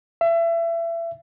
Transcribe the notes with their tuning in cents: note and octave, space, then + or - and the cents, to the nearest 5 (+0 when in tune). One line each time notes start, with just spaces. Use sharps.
E5 +30